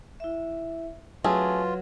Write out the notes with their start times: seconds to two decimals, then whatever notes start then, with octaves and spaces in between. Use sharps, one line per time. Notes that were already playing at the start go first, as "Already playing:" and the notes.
0.20 E4 E5
1.24 F#3 A3 C#4 F4 G#4 B4